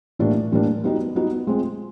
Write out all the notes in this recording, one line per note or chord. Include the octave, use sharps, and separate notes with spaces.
A2 E3 G3 A#3 D4
A2 E3 G3 A#3 D4
G3 B3 D#4 F#4
G3 B3 D#4 F#4
G#3 C4 F4